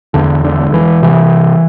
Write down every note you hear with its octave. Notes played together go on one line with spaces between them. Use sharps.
E2 D3
D3
E1
E3
C3 E3